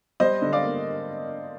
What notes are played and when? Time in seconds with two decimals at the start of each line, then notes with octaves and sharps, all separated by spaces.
0.20 G3 C5 D#5
0.42 D3
0.53 D5 F5
0.63 A#3